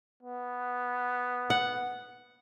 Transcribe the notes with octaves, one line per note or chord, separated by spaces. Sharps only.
B3
F#5